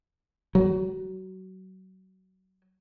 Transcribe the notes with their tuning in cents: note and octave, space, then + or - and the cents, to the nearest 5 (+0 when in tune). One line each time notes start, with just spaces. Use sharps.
F#3 +25